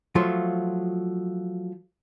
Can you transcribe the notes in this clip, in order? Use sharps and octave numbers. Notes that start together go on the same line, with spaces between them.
F3 F#3 A3 F4